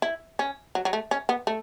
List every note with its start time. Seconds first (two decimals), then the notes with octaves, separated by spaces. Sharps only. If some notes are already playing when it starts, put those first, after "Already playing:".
0.02 E4
0.39 C#4
0.75 F#3
0.85 F#3
0.93 A3
1.11 C#4
1.29 B3
1.47 A3